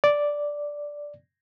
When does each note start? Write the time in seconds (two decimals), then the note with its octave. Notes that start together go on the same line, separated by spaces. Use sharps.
0.04 D5